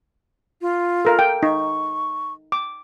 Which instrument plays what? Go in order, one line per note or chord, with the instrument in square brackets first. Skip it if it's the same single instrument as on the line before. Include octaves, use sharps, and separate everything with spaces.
[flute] F4
[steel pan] A4 A#4 F5
G5
[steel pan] D#4 [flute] C#6
[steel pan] D6